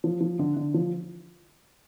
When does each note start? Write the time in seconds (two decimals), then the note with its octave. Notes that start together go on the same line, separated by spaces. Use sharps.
0.04 F3
0.21 F3
0.39 D3
0.56 D3
0.74 F3